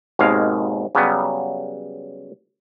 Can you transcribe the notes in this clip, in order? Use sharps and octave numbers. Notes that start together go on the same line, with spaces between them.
G#1 D#2 B2 G#3 F5
C#3 F#3 G3 B3